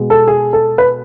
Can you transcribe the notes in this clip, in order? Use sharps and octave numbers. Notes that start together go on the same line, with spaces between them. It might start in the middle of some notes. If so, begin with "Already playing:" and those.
Already playing: B2 G#3 B3
A4
G#4
A4
B4